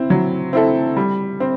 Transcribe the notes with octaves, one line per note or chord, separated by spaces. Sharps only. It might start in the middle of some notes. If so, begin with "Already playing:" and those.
Already playing: C4 E4
F#3
C4 E4 A4
G3
C4